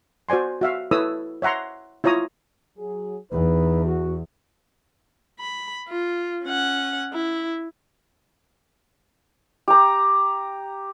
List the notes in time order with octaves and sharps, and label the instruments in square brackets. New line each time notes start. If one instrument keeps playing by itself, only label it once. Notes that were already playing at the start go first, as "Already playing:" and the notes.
[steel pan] F#4 C5 D5 G#5 C6
F#4 E5 F5
E4 A4 B4 C#5 D#6 E6
C#5 E5 F#5 A#5 C6
E4 F4 C#5 A#5 D#6
[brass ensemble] F#3 G#4
[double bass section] E2 [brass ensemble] D#4 B4
[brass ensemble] F#4
[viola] B5
F4
C#4 F#5
E4
[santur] G4 A#5